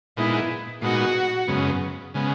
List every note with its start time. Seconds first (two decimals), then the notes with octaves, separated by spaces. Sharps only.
0.17 A#2 G#3 B3 D#4 E4
0.82 A#2 G#3 B3 D#4 F#4
1.48 F#2 C#3 G#3 B3
2.14 C#3 G#3 B3